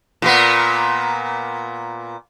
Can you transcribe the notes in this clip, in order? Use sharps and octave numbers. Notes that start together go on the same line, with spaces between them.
A#2 A#3 B3